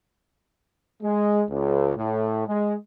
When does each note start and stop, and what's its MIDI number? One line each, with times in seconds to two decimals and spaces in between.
1.03 1.43 56
1.49 1.93 37
1.97 2.47 45
2.47 2.74 56